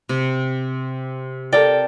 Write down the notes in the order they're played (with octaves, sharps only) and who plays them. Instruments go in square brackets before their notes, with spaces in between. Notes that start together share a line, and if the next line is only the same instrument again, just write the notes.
[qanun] C3
[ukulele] A4 A#4 D5 [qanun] G5